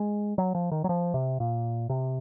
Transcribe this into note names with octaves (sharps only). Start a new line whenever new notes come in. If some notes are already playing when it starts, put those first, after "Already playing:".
Already playing: G#3
F#3
F3
D#3
F#3
F3
C3
A#2
C3